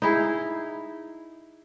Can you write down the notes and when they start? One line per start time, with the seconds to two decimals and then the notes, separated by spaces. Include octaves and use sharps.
0.02 D#4 E4 G#4